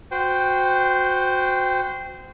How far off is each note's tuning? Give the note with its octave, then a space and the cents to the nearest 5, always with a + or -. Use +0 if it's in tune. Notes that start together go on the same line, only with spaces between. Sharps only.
F#4 -15 C5 -20 G5 +0